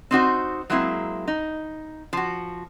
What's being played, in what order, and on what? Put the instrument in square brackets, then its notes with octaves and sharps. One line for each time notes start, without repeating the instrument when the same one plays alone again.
[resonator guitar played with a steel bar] C4 D#4 F#4 C5
F#3 G#3 A#3 C4 E4
D#4
F3 F#4